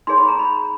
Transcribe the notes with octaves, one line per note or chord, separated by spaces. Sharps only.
D#4 G#4 C#5 C6
B5
A#5
B5